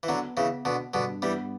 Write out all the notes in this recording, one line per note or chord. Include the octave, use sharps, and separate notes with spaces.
E3
D3 F#3 B3
C#3 E3 B3
B2 D3 B3
G2 B2 D3
E3 G3 B3